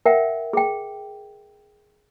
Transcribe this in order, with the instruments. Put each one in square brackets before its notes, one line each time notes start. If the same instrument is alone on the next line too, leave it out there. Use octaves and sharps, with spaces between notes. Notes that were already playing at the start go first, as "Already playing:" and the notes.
[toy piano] A#4 E5 F#5 G5
G#4 G5